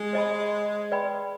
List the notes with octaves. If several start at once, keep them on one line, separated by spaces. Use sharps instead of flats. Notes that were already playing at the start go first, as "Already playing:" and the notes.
Already playing: G#3
C5 D#5 G#5 B5
B4 D5 G5 B5